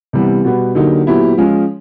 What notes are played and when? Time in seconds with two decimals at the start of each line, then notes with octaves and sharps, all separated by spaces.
0.13 C3 E3 G3 B3
0.44 B2 G3 B3
0.75 D3 F#3 A#3 D#4 G4
1.07 A#2 F#3 B3 E4 G4
1.38 F3 G#3 C#4 F4